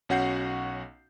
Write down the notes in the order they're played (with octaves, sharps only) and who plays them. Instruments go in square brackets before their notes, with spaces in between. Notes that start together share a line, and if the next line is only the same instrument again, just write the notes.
[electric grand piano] B1 C#4 F#4 F#5 G6 C7